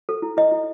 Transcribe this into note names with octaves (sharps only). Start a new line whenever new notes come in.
A4
E4
E4 D#5
E4